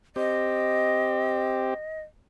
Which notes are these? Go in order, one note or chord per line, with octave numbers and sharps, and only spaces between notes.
C4 G4 D#5